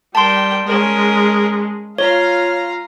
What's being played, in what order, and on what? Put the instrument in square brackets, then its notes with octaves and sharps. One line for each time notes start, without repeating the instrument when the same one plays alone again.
[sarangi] G3 [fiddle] A#4 G5 [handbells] A5 C6
[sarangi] G#3 [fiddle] C#4 A#4
[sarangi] F4 [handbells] C#5 [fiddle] F5 A#5